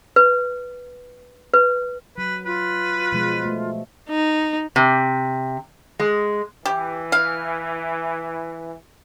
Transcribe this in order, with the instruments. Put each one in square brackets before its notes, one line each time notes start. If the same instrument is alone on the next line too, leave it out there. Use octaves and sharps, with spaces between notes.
[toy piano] B4
B4
[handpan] F#3 [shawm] B4
[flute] F4 [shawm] B4
[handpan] B2 F3 G#3
A3
[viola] D#4
[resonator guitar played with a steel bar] C3
G#3
[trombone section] E3 [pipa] G4
[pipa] F5